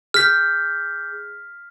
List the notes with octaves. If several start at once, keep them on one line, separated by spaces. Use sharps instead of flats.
G#4 F6 G6 B6